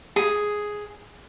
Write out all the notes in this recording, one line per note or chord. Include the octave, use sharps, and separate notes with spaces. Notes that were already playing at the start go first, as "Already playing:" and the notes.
G#4